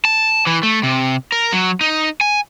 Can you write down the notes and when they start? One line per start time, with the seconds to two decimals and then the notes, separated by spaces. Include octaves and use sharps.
0.05 A5
0.47 E3
0.63 A3
0.83 C3
1.32 A#4
1.53 F#3
1.81 D#4
2.21 G#5